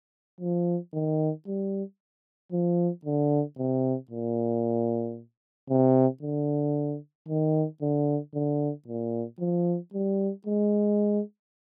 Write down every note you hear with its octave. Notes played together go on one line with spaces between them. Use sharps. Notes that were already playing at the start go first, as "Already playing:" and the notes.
F3
D#3
G3
F3
D3
C3
A#2
C3
D3
D#3
D3
D3
A#2
F3
G3
G#3